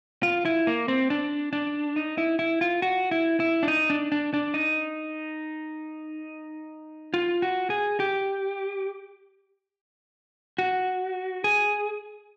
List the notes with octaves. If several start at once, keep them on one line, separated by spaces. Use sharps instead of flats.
F4
E4
A#3
C4
D4
D4
D#4
E4
E4
F4
F#4
E4
E4
D4
D#4
D4
D4
D4
D#4
F4
F#4
G#4
G4
F#4
G#4